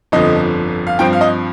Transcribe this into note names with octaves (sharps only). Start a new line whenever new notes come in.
G1 F2 D3 F3 D#5
F5
G2 F3 C4 G5
F5
D#5